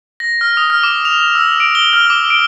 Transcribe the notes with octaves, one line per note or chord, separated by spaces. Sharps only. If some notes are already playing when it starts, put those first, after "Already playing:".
A#6
F6
D#6
F6
D6
F7
E6
D7
G7
F6
D6
D7